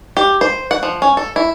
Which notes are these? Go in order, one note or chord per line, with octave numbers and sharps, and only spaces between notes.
G4
C5
F#5
F3
C#4
A4
E4